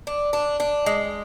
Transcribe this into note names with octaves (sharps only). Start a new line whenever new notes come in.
D4
D4
D4
G#3